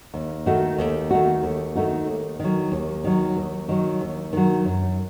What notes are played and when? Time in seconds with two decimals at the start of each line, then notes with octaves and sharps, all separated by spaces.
0.14 D#2
0.46 D#3 A3 D#4 F#4
0.78 D#2
1.11 D#3 A3 D#4 F#4
1.43 D#2
1.75 D#3 A3 D#4 F#4
2.07 D#2
2.40 D#3 F#3
2.72 D#2
3.04 D#3 F#3
3.37 D#2
3.69 D#3 F#3
4.01 D#2
4.33 D#3 F#3
4.65 F#2